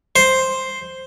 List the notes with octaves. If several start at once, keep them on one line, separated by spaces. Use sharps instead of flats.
C5